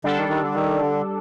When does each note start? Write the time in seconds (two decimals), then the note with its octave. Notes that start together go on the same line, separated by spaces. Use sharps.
0.04 D3 G3 D4 A4
0.17 D#3
0.29 D#3
0.42 D3
0.55 D#3
0.80 D3